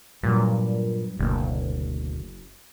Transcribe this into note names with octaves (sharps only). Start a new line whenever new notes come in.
G2 A#2 F#3
F#1 D2 B2 A#3